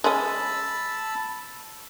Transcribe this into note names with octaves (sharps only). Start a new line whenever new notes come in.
G#3 C#4 A5 B5 E6